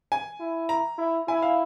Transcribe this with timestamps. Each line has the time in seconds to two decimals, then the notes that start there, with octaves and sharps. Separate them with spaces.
0.12 G#5
0.40 E4
0.69 A#5
0.98 E4
1.28 E4 G#5
1.42 F5